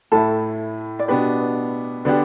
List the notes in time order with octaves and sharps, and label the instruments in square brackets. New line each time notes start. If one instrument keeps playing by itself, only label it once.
[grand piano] A2 A3 E4 [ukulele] A4
[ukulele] D5
[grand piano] B2 B3 D4 G4 [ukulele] B4
[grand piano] D3 B3 D4 G4 [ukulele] D5